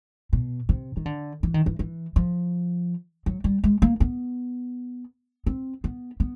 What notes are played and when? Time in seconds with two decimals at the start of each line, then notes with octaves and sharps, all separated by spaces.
0.33 B2
0.69 C3
0.97 D#3
1.05 D3
1.43 E3
1.54 D#3
1.66 E3
1.79 E3
2.16 F3
3.26 F#3
3.44 G3
3.64 G#3
3.82 A#3
4.00 B3
5.46 C4
5.84 B3
6.20 B3